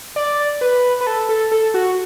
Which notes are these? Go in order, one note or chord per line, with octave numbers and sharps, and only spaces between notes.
D5
B4
B4
A4
A4
A4
F#4